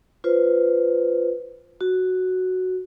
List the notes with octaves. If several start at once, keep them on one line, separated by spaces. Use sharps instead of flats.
F4 B4 C5
F#4